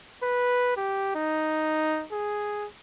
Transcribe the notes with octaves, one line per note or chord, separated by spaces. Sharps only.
B4
G4
D#4
G#4